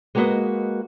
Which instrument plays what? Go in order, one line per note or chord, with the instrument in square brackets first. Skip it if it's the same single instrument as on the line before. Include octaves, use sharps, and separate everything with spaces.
[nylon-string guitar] G#3 A#3 B3 F#4 B4 D#5